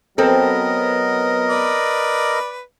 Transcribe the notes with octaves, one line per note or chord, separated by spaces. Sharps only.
F#3 B3 C4 A4 A#4 D#5
B4 D5